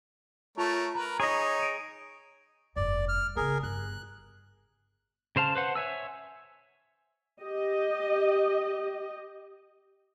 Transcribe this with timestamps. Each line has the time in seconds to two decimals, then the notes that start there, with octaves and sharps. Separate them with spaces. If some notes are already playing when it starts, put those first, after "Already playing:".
0.58 A3 F4 A#4 C#5 A5
0.95 A#4 B4 A#5
1.20 D#4 G#4 C#5 D#5
1.59 D7 D#7
2.76 F1 G2 D5
3.08 F6
3.36 C#3 B3 G#4 A#4
3.63 G1 F#6
5.36 C#3 C5 F5 A5
5.55 B4 C5 F#5
5.75 C#5 E5 G#5 E6
7.42 G4 D#5